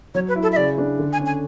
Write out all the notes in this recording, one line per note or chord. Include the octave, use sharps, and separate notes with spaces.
F#3 C#5
B4
E4
A4
E5
C#3 D5
D4
D3
G#5
C#4
G#5